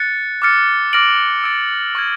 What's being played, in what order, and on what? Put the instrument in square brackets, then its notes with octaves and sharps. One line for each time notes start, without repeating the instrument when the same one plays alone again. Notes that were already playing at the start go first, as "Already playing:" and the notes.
Already playing: [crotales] F#6 A6 C#7
D6 F6 A6 C#7
D6 F6 A#6 D7 F#7
E6 A6 D7
C#6 F6 G#6